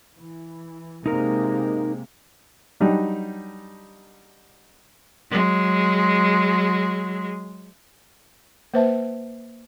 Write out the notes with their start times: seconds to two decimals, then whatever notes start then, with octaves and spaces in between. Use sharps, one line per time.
0.15 E3
1.06 C3 G#3 A#3 D#4 A#4
2.80 F#3 G3 D4 D#4
5.31 F#3 G#3
8.74 A#3 B4 C5 E5 A5